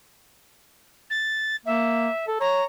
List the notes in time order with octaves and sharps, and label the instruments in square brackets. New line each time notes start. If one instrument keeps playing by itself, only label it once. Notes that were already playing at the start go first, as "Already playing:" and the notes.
[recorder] A6
[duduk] A#3 [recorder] E5
[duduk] A4
[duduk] C#5 [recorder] A#5